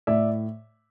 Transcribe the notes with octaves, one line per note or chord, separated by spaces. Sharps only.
A2 D5 E5